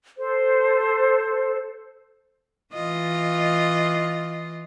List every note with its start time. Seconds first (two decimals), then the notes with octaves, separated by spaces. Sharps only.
0.18 A4 C5
2.74 E3 F4 D#5